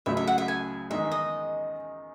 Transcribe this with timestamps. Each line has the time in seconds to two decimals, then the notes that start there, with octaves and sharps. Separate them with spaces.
0.06 C#2 C#3 F#3 A3 E5
0.17 E5
0.27 F#5
0.38 E5
0.48 G#5
0.90 E2 D#3 G#3 D#4 E5
1.12 D#5